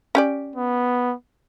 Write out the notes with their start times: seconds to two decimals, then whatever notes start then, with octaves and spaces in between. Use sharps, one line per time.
0.15 C#4 G4 D5
0.56 B3